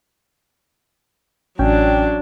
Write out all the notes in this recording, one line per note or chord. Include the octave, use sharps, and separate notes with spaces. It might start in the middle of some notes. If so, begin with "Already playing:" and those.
A1 F#3 C#4 D4 G5